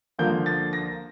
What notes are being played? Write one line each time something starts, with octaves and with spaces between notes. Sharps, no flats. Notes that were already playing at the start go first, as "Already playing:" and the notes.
D3 F3 A#3 F4 G6
A6
A#6